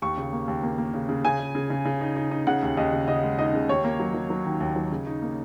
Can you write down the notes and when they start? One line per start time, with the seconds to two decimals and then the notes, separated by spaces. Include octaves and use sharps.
0.02 D#2 C#6
0.17 C#3
0.33 A#3
0.48 D#2
0.63 A#3
0.78 A#3
0.94 C#3
1.09 C#3
1.24 C#3 G#5
1.40 C#3
1.55 C#3
1.70 C#3
1.85 C#3
2.01 D#4
2.16 D#4
2.31 D#4
2.47 C#3 F#5
2.62 D#2
2.77 D#2 D#5
2.93 C#3
3.08 C#3 D#5
3.23 G#3
3.38 D#4 D#5
3.54 C#3
3.69 D#2 C#5
3.84 A#3
4.00 F#3
4.14 F#3
4.30 F#3
4.46 D#3
4.60 D#2
4.76 F#3
4.91 C#3
5.07 D#4
5.22 A#3